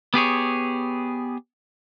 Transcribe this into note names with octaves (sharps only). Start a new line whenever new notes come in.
B3 G4 G#4 C#5